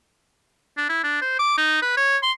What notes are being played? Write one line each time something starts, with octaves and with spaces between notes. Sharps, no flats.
D4
E4
D4
C5
D6
D#4
B4
C#5
C6